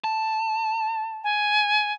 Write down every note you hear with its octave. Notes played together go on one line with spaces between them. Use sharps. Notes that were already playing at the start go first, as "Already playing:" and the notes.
A5
G#5